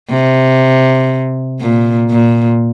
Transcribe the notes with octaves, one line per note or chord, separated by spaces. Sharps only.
C3
A#2
A#2